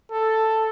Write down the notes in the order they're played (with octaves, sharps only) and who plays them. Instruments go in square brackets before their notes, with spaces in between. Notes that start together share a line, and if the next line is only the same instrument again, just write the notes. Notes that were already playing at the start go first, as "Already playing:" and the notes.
[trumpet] A4